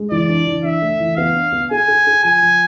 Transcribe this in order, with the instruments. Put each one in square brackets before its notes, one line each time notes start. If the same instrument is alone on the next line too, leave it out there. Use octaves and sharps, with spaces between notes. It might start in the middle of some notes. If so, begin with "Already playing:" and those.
Already playing: [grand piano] G#3
[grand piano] E3 [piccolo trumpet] D5
[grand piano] D4
E3
[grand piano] D4 [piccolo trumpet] E5
[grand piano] A3
E3
[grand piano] B3 [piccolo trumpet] F5
[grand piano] D4
B3
[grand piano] G#4 [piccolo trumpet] G#5
[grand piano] G#4
G#4
[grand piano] F3 [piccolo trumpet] G#5
[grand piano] F3